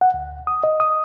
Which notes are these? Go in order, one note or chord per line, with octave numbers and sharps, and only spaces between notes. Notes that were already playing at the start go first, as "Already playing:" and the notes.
F#5
D2
D#6
D#5
D#6